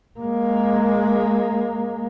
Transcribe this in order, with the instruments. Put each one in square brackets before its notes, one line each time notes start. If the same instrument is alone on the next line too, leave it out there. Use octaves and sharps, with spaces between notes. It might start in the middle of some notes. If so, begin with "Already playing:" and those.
[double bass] G#3 A#3